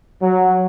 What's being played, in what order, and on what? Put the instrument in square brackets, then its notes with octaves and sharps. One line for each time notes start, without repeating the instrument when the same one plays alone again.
[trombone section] F#3